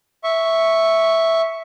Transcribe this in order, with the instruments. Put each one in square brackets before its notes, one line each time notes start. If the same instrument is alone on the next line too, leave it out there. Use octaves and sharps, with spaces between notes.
[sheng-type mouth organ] E5 C#6